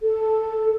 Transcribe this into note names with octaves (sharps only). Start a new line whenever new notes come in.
A4